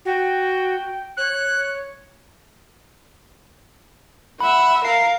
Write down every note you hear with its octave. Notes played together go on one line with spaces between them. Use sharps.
F#4 G5
C#5 F#6
E5 F#5 B5
A#4 F5 C7